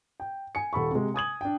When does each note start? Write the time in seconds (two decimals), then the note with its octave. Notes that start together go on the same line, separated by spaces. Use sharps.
0.20 G5
0.55 G#5 C#7
0.73 D#1 A4 B5 C#6
0.91 C3 G#3
1.14 G#5 D#6 G#6 F#7
1.41 D4 G5